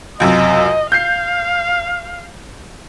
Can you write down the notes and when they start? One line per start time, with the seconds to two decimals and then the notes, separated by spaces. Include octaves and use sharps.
0.20 C#2 F#2 C3 D#5
0.92 F5 G6 C7